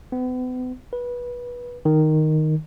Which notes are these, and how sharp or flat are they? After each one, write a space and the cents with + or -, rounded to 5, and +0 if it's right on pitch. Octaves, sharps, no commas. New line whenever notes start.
B3 +40
B4 -20
D#3 -5